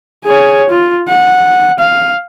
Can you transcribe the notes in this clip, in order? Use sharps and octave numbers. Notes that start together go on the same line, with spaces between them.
G#4 C#5
F4
F#5
F5